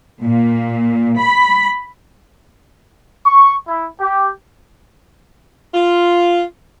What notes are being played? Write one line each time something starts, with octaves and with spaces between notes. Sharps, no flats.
A#2
B5
C#6
E4
G4
F4